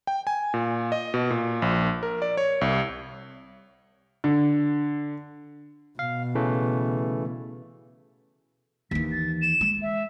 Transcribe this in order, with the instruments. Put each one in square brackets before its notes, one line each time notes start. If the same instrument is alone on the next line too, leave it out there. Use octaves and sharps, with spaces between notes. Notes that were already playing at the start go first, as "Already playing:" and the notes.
[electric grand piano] G5
G#5
A#2
D#5
B2
A#2
A#1
A#4
D5
C#5
C2
[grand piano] D3
[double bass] B2 [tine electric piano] F5
[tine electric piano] C#3 E3 A3
[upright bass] D#2 E3 [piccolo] B6
[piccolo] A6
E7
[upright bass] G#3
[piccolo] E5